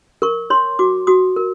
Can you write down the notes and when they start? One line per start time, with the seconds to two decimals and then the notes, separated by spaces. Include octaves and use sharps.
0.22 A#4 C#6
0.50 C#5 C6
0.79 F#4 D6
1.07 F#4 D#6
1.36 A#4